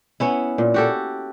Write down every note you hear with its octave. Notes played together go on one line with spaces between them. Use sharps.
B3 C#4 E4
A#2
F#4 G4 A4